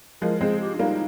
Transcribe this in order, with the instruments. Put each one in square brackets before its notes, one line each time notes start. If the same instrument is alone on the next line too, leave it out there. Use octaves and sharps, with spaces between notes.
[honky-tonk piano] F3 G#3 [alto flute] A#4
[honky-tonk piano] G#3 C4 [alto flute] G#4
[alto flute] G4
D4
[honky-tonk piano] G3 A#3 [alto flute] D#4